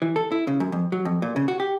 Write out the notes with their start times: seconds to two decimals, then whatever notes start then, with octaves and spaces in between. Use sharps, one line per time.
0.02 E3
0.16 A4
0.32 E4
0.47 C#3
0.60 F#2
0.72 F2
0.92 F#3
1.05 F2
1.22 A#2
1.36 C#3
1.48 F#4
1.60 G4